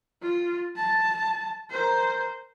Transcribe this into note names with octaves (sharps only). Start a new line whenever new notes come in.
F4
A5
A#4 C5